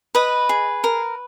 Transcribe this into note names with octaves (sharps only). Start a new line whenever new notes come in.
B4 D#5 B5
G#4
A#4